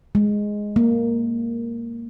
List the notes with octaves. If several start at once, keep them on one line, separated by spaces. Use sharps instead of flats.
G#3
A#3